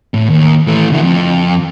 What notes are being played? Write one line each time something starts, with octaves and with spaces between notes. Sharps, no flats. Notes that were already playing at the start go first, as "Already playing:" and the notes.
A2
D#2
E3 A3
D3 E4
F2